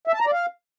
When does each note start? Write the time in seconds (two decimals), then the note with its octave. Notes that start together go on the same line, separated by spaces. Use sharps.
0.07 E5
0.14 A5
0.20 A#5
0.26 D5
0.33 F5